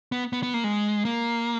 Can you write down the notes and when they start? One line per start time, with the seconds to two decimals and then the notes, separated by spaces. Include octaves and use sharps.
0.12 B3
0.33 B3
0.43 B3
0.54 A#3
0.64 G#3
1.05 A#3